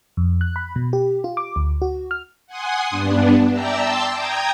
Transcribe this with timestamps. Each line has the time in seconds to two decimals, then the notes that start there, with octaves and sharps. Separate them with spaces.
0.17 F2
0.41 F#6
0.56 B5
0.76 B2
0.93 G4
1.24 F4
1.37 D6
1.56 D2
1.82 F#4
2.11 F6
2.47 F#5 G#5 C6 D#6
2.90 G2 B3 D4
3.50 D5 E5 G5 A5 A#5 E6
3.80 G5 A5 C6 D6 E6 G6
4.14 G5 A#5 D#6 G#6